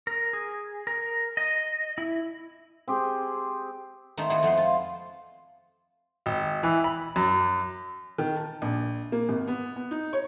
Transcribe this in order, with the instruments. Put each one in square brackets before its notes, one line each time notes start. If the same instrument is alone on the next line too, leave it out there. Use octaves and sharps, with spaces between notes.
[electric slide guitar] A#4
G#4
A#4
D#5
E4
[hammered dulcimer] C4 G4 G#4
[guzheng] D#3 A3 C4 D#4
A3 B3 C4 E4 G#4
F2 A3 B3 C6
F4
[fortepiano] G#1
E3
B5
F#2
[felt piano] D#3
A5
A#1
A#3
G#1
B3
B3
D#4
C#5